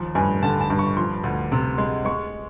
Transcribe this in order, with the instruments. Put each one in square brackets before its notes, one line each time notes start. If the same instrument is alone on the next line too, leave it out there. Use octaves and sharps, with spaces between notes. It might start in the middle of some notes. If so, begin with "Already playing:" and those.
Already playing: [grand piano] D#2 F3
G2 G#5
D3 A5
A5
G2
C#6
F3 C6
D2
C3
G#3
G#3 C#6